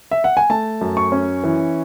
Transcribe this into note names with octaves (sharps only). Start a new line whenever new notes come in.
E5
F#5
G#5
A3 A5
F#2
C#6
C#4
E3